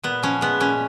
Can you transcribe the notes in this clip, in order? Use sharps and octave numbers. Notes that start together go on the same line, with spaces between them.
A#2 B3
F3 C#4
G#3 B3
A#2 C#4